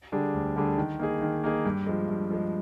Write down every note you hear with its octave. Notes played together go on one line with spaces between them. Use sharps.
D3 G3 D4 G#4
D2
D3 G3 D4 G#4
D#3
A#3 D#4 G#4
D#3
A#3 D#4 G#4
G2
F3 G#3
G2
F3 G#3